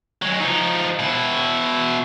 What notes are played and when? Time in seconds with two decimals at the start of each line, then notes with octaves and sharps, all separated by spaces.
0.22 F#3 G#3
0.41 F3 D#4
0.99 B2 E4